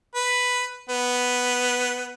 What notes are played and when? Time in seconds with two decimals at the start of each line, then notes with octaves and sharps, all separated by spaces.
0.15 B4
0.89 B3